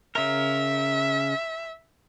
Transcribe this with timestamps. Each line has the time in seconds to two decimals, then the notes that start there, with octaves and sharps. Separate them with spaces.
0.15 C#3 A#4 E5